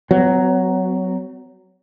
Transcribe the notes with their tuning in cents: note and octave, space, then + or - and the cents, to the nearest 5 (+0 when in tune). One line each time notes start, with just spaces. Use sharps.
F#3 +10 C4 -45